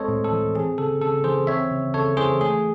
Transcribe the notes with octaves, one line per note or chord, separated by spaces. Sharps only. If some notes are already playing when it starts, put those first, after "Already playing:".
Already playing: G#3 C4 A4 C5 C#5 D#5
A2
A4
E3
C4 G#4
C#3 A4
C#3 A4
E3 G#4 C5
C4 C#5 E5
C#3
C#3 A4 C#5
E3 G#4 C5
A3 G#4